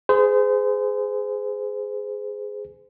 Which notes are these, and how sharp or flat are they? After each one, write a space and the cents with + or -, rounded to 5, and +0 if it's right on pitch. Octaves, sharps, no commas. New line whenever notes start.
G#4 +5 C5 -35